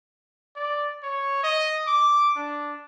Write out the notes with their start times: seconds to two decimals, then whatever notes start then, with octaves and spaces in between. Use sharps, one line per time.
0.56 D5
1.03 C#5
1.43 D#5
1.87 D6
2.36 D4